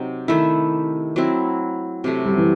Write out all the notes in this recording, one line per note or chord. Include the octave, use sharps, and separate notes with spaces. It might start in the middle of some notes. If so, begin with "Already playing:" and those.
Already playing: C3 F#3 C4 D#4
D#3 A3 E4
F#3 C4 E4
C3 F#3 A3
G3
E3